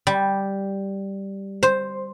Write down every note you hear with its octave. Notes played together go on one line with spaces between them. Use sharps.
G3
C5